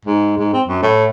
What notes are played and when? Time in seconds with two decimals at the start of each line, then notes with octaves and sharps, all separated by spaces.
0.05 G#2
0.38 G#2
0.53 C4
0.67 F#2
0.83 A2